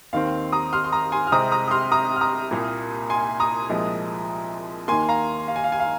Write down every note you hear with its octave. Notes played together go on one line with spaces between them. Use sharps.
D#2 D#3 C4 F5
A#5 D#6
C6 F6
C6
A#5 D#6
G#5 C6
F6
C2 C3 G#3 C4 A#5 D#6
A#5 D#6
D#6
C6 F6
A#5 D#6
F6
A#5 D#6
C2 A#2 A#3
G#5 C6
A#5 D#6
C2 A#2 F3 G#3
D#2 D#3 A#3 G#5 C6
F5 A#5
F5
G#5
F5
G#5
F5